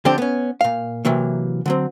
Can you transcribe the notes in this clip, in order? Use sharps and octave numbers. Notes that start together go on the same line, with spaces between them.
D3 F3 C4 D4 G4
B3 C#4
A#2 F5
C3 E3 F#3 A#3
D3 F#3 C4